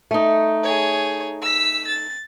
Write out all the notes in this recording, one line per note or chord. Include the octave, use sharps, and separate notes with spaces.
A3 D#4
G#4 C#5
E6 B6
A6